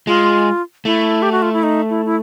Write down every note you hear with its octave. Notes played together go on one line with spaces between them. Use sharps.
G#3 F4
A3 E4
G4
F#4
F4
E4
D#4
E4
E4